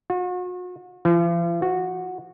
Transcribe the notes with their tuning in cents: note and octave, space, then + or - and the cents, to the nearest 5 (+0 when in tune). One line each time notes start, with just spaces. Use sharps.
F#4 -40
F3 -45
F#4 -10